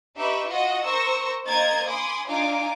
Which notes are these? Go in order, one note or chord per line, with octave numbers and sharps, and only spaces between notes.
D#4 G4 B4 E5 C#6
F4 F#4 D#5 F#5
A#4 C5 C#6 E6 A#6
A#3 A#4 C5 D#5 G#6 A6
G#5 B5 C6 D6 D#6
D4 D#4 F4 F5 G#5 D6